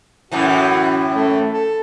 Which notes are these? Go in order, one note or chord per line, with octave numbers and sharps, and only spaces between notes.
F#2 A2 E3 F#4
A3
A4